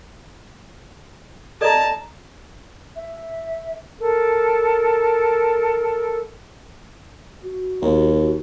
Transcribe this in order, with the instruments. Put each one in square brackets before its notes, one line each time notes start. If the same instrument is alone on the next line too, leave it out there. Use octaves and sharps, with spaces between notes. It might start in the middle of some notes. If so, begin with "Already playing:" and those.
[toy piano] A4 D5 D#5 [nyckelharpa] A5 A#5
[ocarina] E5
[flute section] A4 A#4
[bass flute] F#4
[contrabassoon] D#2